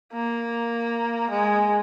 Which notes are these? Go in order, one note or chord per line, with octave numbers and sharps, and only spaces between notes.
A#3
G#3